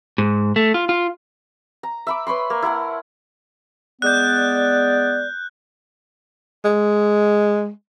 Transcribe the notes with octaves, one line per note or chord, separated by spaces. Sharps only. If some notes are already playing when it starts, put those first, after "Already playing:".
G#2
A3
F4
F4
A#5
E5 B5 D6
B4 C#5 B5 C6
A#3
E4 A#4 F#5 A5
G#3 B3 D5 F#6 G6
G#3